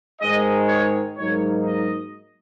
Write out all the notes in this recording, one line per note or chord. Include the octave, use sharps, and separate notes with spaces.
G#2 D#3 G#3 D#5
C#5
G#2 F#3 A#3 D#4 C#5
D#5